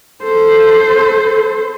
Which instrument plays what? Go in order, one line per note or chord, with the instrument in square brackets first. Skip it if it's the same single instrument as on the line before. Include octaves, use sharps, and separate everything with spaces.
[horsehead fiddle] A4 C5